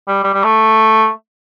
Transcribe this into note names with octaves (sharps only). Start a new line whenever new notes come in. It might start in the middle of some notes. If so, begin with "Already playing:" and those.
G3
G3
G3
A3